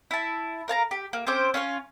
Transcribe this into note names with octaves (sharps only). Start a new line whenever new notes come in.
E4 A5
A#4 F5 A5 A#5
G4
A#3
C4 C#4 C5 D6
C#4 F4 B4 C#5